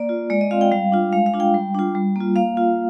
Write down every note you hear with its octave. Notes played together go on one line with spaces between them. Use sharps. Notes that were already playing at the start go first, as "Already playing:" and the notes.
Already playing: A#3 D5
F4
G#3 D5
D#5
C4 F4 F5
G5
G3 F5
D4 F4
G#3 F5
F5
D4 F4
G5
G3
D4 F4
G3
A#3 F4
A#3 F5
F4